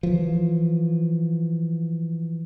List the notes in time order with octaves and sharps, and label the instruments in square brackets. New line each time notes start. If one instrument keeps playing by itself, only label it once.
[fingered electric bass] E3 F3